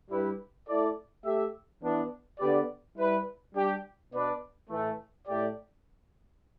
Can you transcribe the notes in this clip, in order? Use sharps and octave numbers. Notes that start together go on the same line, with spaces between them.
G2 G3 E4 G4 B4
A3 E4 A4 D5
A3 G4 E5
E3 B3 D4
D3 B3 G4 B4 D5
G3 E4 B4
G3 D4 G4
B2 B3 D4 B4 D5
A2 E3 A3
A2 A3 G4 D5